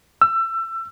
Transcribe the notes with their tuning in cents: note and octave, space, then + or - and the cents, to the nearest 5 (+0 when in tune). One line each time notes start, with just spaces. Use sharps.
E6 +25